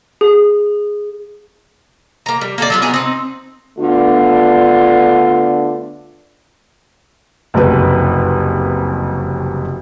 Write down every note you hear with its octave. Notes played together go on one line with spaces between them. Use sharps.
G#4
A#3 A#5
G3
A#3 A4 B4 D5
F#3 G3 F4
B3 D4 D#4 G#4
C4 D#4
D3 A3 B3 D4 F4
F#1 C2 F2 B4